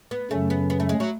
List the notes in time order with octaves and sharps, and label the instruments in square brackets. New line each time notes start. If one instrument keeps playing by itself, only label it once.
[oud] B3
[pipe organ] F#2 C#3 F#3 C#4 [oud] A3
[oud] B3
B3
A3
G#3
F#3